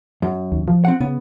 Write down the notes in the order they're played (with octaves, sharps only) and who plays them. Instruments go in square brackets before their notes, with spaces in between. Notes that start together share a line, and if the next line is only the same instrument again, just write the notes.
[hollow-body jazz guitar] F#2
[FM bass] D#2
F3
[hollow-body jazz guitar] C4 F#5
[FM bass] C#3 [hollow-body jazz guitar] B3